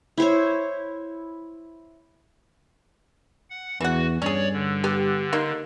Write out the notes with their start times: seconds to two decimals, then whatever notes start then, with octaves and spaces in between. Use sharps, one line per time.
0.18 E4 C5 C#5
3.50 F#5
3.81 E2 E3 F#4 F#5
4.22 G2 C#4 G#4 C#5 D5
4.53 D3
4.84 B3 G4
5.33 A#3 D#4 C6